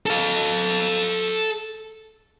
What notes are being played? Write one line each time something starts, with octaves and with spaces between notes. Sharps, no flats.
A4 F5